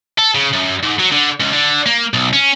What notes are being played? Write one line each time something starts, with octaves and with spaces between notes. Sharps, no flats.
A4
C#3
F#2
G#2
F#3
D3
C#2
D3
A#3
B1
C#4